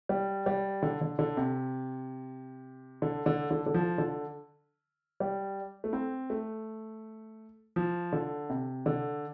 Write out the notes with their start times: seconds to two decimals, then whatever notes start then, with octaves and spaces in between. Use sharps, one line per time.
0.09 G3
0.46 G3
0.82 D3
1.01 D3
1.19 D3
1.37 C3
3.02 D3
3.26 D3
3.51 D3
3.66 D3
3.74 F3
3.98 D3
5.20 G3
5.84 A3
5.93 C4
6.30 A3
7.76 F3
8.13 D3
8.50 C3
8.86 D3